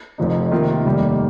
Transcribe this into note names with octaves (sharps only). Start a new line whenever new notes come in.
F1 F2 F3 D#4
C3 D#3 A#3 F4
F1 D#2 D#3 G3 A#3